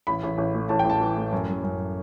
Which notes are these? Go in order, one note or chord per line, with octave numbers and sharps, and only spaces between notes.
A1 B5
A1
A1
A2
A1 A5
G5
A1 A5
E3
A2
F#2
F#2
F#2